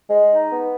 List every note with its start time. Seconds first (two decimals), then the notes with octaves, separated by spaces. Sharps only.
0.10 G#3
0.30 D#4
0.51 B3